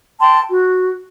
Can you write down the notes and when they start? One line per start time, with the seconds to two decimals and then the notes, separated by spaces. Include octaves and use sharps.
0.19 G5 A5 C6
0.49 F#4